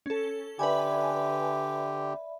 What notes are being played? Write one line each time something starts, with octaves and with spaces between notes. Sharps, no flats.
C#4 A4
D3 G4 B4 D5 E5 G#5 B5